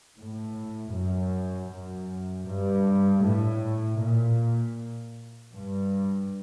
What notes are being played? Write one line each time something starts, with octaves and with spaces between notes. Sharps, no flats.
A2
F#2
F#2
G2
A2
A#2
G2